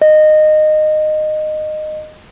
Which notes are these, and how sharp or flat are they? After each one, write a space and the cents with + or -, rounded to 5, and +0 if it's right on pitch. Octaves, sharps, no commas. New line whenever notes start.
D#5 -20